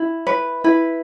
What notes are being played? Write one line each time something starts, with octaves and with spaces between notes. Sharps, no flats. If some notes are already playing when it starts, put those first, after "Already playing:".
Already playing: E4
B4
E4 B4